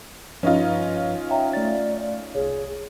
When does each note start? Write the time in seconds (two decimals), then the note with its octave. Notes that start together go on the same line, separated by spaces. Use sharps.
0.43 G2 F3 C#4 D#4 F4 B4
1.30 C#5 E5 G5 A#5
1.53 A3 D5 A6
2.35 C2 G#4 C#5